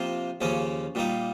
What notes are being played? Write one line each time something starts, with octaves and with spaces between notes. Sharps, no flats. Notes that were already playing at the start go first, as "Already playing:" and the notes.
Already playing: C3 F3 A#3 F4 C5
D#2 C#3 F3 A#3 C#4
A#2 G3 A#3 D#4